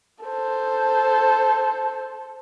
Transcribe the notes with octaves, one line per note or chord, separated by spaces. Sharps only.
A4 C5